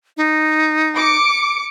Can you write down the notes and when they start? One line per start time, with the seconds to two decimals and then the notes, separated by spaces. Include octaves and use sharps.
0.17 D#4
0.95 D6 C#7 D7